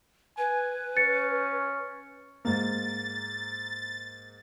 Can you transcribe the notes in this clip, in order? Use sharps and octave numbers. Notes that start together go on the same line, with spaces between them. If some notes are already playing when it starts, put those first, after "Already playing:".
B4 G#5
C#4 A6 C#7
G#2 A#3 A6